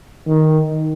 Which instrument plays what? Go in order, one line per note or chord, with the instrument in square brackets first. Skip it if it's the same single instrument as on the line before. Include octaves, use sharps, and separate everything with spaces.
[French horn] D#3